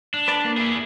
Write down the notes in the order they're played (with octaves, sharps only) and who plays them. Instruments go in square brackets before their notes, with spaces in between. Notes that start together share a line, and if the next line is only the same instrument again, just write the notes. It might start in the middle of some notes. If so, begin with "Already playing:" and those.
[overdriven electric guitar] D4
[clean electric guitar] B4 D5 A5
A#3
[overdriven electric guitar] E4 G#4